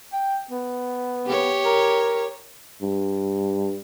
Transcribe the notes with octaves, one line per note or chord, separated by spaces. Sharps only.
G5
B3
G4 C#5
A#4
G2